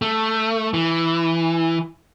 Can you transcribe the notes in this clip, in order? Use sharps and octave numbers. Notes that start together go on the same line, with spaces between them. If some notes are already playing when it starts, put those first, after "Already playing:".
A3
E3